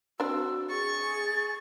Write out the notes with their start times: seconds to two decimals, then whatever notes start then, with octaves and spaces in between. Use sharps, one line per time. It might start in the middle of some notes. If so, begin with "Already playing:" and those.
0.20 C4 D4 F#4 E6
0.70 G#4 C#6 A6